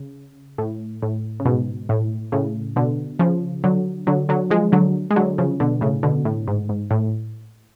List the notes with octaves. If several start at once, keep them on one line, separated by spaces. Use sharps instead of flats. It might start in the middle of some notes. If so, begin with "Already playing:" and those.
Already playing: C#3
A2
A2
C#3
G#2 B2
A2
A2 C#3
B2 D3
C#3 F3
D3 F#3
D3 F#3
D3 F#3
F3 G#3
D3 F#3
G#3
D3 F#3
C#3 F3
B2 D3
A2 C#3
B2 D3
A2
G#2
G#2
A2